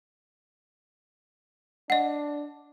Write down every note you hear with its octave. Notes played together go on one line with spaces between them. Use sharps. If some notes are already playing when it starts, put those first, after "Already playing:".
D4 D#5 F#5